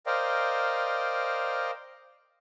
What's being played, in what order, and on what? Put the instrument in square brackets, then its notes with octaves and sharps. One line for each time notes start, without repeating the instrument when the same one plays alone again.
[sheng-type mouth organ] A#4 C5 D5 D#5 F5 G5